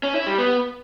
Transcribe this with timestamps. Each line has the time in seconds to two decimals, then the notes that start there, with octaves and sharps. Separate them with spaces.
0.03 C#4
0.15 E4
0.27 G3
0.38 B3